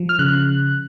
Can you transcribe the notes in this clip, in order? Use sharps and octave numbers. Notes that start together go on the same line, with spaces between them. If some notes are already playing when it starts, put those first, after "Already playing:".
Already playing: F3
F6
C#3 F#6